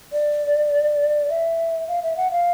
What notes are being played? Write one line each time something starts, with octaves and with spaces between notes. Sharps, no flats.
D5
E5
F5
E5
F#5
F5